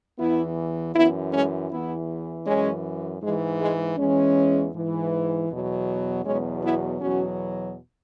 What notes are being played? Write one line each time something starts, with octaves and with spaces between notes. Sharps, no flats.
E2 E3 B3 E4
F#2 E3 B3 E4
G#3 C#4
E2 E3 B3 E4
F#2 E3 G#3 C#4
G#2 E3 G#3
G#3
E2 E3 G#3 C#4
G#2 E3
E2 B2 F#3
E2 B2 F#3 G#3 C#4
B3 E4
E2 B2 F#3 C#4 F#4